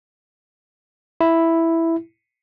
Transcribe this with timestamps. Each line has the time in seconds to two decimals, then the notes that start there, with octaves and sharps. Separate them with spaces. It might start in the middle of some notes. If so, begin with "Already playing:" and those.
1.21 E4